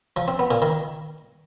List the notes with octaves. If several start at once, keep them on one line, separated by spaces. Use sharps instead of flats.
F3
C4
B3
A#2
D#3